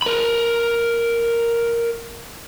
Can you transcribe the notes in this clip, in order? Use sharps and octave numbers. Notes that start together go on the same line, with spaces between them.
A#4 B5